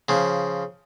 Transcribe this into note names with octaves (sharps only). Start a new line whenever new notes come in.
C#3 F3